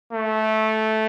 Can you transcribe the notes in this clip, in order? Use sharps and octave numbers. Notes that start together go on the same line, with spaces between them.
A3